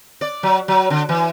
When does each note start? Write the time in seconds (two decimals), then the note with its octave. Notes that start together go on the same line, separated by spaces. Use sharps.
0.21 D5
0.43 F#3
0.68 F#3
0.90 D3
1.09 E3